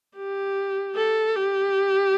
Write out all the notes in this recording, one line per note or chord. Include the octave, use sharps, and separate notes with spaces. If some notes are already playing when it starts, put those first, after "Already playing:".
G4
A4
G4